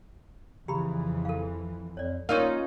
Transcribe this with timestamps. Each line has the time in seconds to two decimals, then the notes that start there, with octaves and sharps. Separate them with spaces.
0.68 F2 C#3 E3 G4 A#5 B5
1.25 A4 F5
1.97 F2 C#5 D5
2.29 A#3 C#4 D#4 F4 A#4 D5